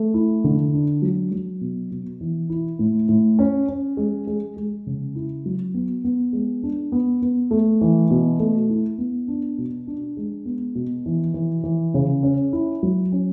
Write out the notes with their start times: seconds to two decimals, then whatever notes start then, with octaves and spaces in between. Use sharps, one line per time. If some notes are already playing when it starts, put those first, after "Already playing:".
Already playing: A3
0.14 E4
0.44 D3
0.73 D4
1.02 F#3
1.32 F#3
1.61 B2
1.91 B2
2.21 E3
2.49 E4
2.79 A2
3.09 A2
3.39 C#4
3.69 C#4
3.97 G#3
4.27 G#3
4.57 G#3
4.87 C#3
5.15 E4
5.46 F#3
5.74 B3
6.04 B3
6.33 G#3
6.63 D4
6.92 B3
7.22 B3
7.51 A3
7.81 E3
8.10 B2
8.40 A3
8.69 E4
8.98 B3
9.28 D4
9.58 B2
9.87 D4
10.17 G#3
10.46 B3
10.75 B2
11.06 E3
11.34 E3
11.64 E3
11.94 C#3
12.23 C#4
12.53 E4
12.83 F#3
13.12 C#4